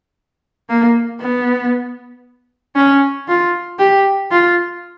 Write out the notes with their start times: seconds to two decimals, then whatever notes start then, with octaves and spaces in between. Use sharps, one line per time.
0.69 A#3
1.20 B3
2.76 C#4
3.28 F4
3.79 G4
4.31 F4